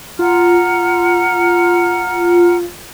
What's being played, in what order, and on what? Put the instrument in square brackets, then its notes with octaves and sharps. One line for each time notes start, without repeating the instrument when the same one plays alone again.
[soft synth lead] F4 [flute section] F#5 A#5 F6